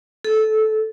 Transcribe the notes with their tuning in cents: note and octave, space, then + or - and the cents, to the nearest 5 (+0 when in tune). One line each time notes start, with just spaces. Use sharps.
A4 -15